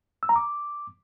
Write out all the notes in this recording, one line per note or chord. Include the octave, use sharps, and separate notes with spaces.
E6
A#5
D6